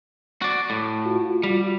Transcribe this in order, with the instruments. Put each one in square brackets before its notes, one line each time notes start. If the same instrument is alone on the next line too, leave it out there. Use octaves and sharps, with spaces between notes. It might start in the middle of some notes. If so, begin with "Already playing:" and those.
[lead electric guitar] F#4 D5
A2
[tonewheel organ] F4 F#4
[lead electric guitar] G3